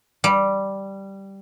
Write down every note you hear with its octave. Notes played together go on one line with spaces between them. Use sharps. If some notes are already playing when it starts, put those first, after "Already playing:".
G3